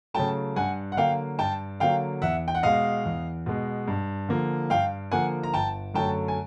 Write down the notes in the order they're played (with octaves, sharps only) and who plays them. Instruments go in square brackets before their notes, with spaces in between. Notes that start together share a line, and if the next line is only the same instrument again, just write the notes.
[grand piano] C#3 F#3 A3 G5 A5
G2 F#5 G#5
F#5
D3 F#3 A#3 F5 G5
G2 G5 A5
D3 F#3 A#3 F5 G5
E2 E5 F#5
G5
F#5
B2 G#3 D#5 F5
E2
B2 G#3
G2
D3 F3 A#3
G2 F5 G5
D3 F3 A#3 F#5 G#5
A#5
G1 G5 A5
F#2 D3 F#3 A3 G5 A5
G#5